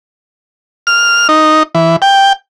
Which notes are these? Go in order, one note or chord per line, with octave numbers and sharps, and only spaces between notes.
F6
D#4
E3
G5